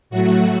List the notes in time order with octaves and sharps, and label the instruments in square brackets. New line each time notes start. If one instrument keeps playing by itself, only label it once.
[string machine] A2 F#3 A3 F#4